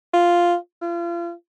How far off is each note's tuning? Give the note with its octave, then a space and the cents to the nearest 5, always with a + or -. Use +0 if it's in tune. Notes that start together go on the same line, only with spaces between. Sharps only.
F4 +0
F4 -35